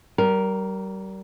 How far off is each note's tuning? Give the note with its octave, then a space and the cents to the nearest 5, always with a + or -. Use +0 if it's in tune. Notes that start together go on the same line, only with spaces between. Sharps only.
G3 -35 A#4 +0